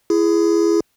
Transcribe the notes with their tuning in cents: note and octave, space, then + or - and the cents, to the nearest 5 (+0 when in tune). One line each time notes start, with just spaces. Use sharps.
E4 +30 G#4 +0